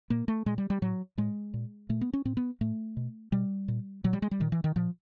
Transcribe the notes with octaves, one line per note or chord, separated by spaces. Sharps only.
A#2 A#3
A3
A#2 G#3
G3
G3
A2 F#3
A2 G#3
A#2
A#2 A3
B3
C#4
A2 C4
B3
A2 A3
B2
B2 G3
A#2
A#2 F#3
G3
G#3
G3
A#2 D#3
E3
D#3
A#2 F3